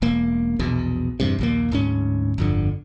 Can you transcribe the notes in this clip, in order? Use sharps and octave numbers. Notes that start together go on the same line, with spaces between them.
E1 A#3
A#1 E2 B2
E2 G2 C3
A#1 D#2 A#3
D1 G#2 C#4
G1 F2 D3